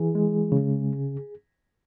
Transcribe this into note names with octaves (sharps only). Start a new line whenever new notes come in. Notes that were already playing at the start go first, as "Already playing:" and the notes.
Already playing: E3 G#4
G#3
C#3